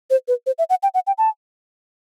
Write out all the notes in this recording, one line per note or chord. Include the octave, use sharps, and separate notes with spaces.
C5
B4
C5
E5
F#5
G5
F#5
G5
A5